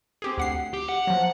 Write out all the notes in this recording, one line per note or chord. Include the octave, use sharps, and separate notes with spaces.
C4 G4 G#4
D2 F#5 C7
G4
F#5
F3 F#3